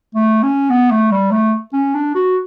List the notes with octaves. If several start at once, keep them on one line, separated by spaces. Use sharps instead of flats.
A3
C#4
B3
A3
G3
A3
C#4
D4
F#4